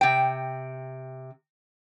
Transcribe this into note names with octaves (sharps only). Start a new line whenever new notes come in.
C3 G5